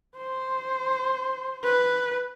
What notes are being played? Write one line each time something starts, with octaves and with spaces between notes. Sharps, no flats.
C5
B4